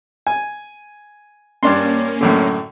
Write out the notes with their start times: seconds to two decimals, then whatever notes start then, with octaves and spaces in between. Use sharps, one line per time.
0.27 G#5
1.63 G2 A#3 C#4 D4 C6
2.21 F#2 A2 D3